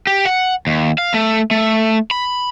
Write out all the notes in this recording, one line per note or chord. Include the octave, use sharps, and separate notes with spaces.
G4
F#5
D#2
F5
A3
A3
B5